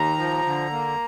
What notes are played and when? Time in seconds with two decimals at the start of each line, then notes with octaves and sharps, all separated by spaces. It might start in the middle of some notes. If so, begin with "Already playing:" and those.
Already playing: D#2 A#5
0.18 F3
0.46 D3
0.72 A#3